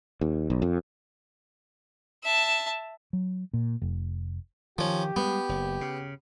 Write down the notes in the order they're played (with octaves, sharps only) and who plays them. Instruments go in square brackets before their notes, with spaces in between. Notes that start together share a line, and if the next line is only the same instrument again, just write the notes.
[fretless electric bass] D#2
B1
F2
[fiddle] E5 A5
[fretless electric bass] F#3
A#2
F1
[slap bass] D#3 [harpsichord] F3 C#4 [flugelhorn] G4
[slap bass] G3 G#3 [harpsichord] B3
[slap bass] F#1
C#3